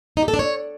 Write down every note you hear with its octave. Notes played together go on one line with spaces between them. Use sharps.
D#4
G4
A4
D4
C#5